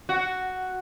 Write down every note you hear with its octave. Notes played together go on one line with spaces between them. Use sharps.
F#4